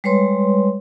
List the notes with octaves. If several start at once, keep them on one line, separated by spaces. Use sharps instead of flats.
G3 G#3 B4 C#5 C6